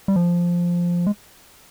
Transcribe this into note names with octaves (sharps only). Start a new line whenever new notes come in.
G3
F3
G#3